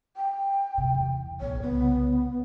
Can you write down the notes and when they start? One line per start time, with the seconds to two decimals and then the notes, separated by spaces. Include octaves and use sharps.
0.17 G5
0.78 C3
0.94 E2
1.41 B1 A2 C#5
1.62 C2 C#3 B3